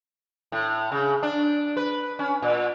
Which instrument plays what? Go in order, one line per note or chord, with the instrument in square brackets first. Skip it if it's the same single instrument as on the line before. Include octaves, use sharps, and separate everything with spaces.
[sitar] A2
C#3
D4
B4
C#4
A#2